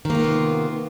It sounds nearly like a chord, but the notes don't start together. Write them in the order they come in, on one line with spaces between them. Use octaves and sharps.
D#3 A#3 F4 B3 C3